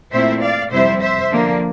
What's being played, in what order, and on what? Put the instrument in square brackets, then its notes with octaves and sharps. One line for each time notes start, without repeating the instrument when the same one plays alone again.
[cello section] A#2 A3 C4 E4 C5 E5
D5 F5
F2 C3 G3 C4 E4 C5 E5
C5 E5
D3 F3 A#3 D4